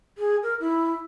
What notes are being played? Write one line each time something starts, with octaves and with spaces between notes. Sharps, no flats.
G#4
A#4
E4